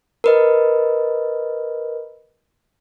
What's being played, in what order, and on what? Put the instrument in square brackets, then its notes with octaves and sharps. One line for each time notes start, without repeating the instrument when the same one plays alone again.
[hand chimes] A#4 B4 D#5